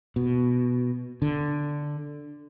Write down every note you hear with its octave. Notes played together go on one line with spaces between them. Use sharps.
B2
D3